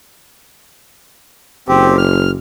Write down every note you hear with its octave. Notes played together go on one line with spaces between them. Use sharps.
F#1 C4 G4
F6